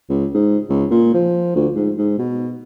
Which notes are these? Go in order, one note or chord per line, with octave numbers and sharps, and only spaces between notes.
C#2
G#2
C#2
A#2
F3
D2
G#2
G#2
B2